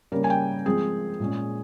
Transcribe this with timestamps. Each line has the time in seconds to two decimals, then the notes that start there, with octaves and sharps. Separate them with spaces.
0.12 C#3 G3 A#3 A#4
0.24 G#5
0.30 G5
0.65 F3 G#3 C4 G#4
1.20 A#2 G#3 C#4